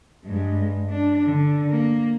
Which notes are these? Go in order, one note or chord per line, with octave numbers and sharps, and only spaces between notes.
G2 G#3
D4
D3
A#3